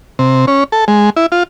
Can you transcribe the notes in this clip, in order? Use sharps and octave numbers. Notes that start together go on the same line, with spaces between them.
C3
C#4
A4
G#3
E4
F4